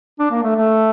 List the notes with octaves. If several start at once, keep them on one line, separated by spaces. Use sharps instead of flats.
D4
A#3
A3
A3